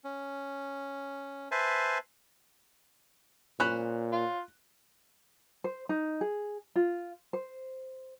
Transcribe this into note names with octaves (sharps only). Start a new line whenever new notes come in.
C#4
B4 C5 E5 G#5 A5
A#2 C#4 C5 B5 F#6
F4
C5
D#4
G#4
F4
C5